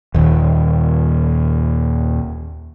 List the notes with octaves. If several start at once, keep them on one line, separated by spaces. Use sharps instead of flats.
D#1 D#2